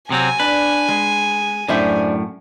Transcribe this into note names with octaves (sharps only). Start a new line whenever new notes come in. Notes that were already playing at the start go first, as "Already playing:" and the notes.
C3 F#3 C4 G#5
D4 B4
G#3
F#2 A2 D4 C5 E5